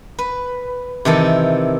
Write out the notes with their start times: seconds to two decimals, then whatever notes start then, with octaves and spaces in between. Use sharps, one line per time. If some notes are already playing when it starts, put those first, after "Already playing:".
0.18 B4
1.05 C3 D#3 E3 A4